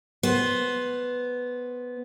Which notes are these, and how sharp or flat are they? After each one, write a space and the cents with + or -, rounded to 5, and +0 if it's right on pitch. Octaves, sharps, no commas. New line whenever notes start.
B3 +0 C5 +10